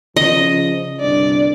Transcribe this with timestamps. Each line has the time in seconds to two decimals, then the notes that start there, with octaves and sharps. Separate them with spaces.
0.16 C#3 F3 D#5
1.00 G1 C2 D4 D5